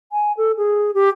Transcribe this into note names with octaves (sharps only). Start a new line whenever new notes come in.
G#5
A4
G#4
G4